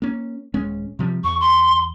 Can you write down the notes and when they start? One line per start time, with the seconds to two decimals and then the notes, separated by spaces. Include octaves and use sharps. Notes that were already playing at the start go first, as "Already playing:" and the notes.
0.02 A#3 C#4
0.54 D#1 G#3 C#4
0.99 C3 F3 G3
1.24 E2 C#6
1.40 C6